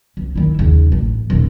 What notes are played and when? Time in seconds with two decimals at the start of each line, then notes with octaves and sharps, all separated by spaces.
0.17 C#2
0.36 D#3 E4
0.59 D#2 C#3
0.92 A1
1.30 D#1 C#4